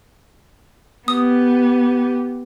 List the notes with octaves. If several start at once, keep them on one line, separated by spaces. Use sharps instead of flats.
B3 G4 D#6